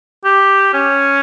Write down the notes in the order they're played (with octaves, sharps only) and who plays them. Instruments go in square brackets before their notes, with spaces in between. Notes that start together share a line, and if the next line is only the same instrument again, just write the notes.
[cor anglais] G4
C#4